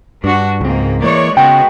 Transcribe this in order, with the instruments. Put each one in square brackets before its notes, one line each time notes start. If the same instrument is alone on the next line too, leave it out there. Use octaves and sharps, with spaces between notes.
[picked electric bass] G2 [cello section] D4 F#4
[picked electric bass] C#2 C4 [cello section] G#2 A#3
[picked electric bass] E3 A#3 [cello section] G#3 C#5 D5
[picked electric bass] C#3 [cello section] G#3 B3 F#4 [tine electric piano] G5